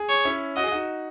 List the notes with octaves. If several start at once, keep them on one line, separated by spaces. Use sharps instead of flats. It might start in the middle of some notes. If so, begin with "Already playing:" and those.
Already playing: G#4
C#5
C#4 E4
F#4 D#5
G#4
D#4 F#4